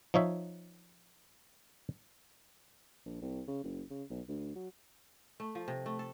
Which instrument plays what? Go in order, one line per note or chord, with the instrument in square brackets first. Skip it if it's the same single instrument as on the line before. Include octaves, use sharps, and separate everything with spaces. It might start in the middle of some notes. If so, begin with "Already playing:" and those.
[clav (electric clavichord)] F3 D#4 C#5 E5
[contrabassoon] A#1
C2
C#3
F#1
C#3
B1
D2
F#3
[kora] A3
F3
C3
A3
A4